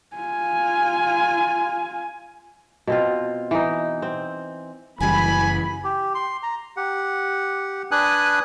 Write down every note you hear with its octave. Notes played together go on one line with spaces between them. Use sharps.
F4 G#5
B2 C4 F4
E3 D#4
C4
F#1 E3 G3 G#5 B5
G4
C6
A#5
G4 F#5
D4 B4 G#5 D#6 F#6